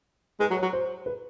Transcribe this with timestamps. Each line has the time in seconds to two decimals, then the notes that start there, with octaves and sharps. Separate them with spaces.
0.40 G#3 B4
0.51 F#3
0.57 C#5
0.62 F#3
0.73 C5
1.06 B4